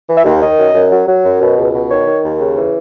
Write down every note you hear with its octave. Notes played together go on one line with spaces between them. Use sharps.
E3
E5
D#2
D#3 D#5
F#2
F#2
F#3
F#3
F#2
B2
C#2
B2
D#3 C#5
D#3
D#2
C#3
E3